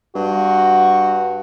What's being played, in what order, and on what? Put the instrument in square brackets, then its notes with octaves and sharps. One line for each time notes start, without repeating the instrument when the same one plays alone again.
[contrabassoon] G2 [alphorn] F#4